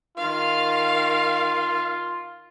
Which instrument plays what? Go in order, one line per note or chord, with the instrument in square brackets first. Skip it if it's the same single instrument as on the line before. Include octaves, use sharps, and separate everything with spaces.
[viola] D#3 F5 [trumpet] F4